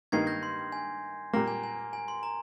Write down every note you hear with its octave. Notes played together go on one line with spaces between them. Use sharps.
G2 D#3 A#3 D#4 G#6 C7
G6 A#6
C6
G#5
A#2 G3 A#3 A#5
G#5
G#5
G#5
C6
A#5